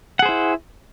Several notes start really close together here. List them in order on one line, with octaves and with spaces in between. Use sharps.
F#5 G#4 C5 E4